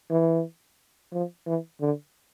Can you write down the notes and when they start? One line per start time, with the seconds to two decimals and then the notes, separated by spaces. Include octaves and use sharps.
0.11 E3
1.12 F3
1.46 E3
1.81 D3